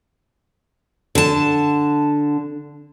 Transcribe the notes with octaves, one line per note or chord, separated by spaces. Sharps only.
D3 A5